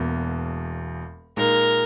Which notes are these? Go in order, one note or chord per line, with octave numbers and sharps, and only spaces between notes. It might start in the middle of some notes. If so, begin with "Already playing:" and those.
Already playing: E1 E2 B2 A#3
A#2 G#3 D#4 A#4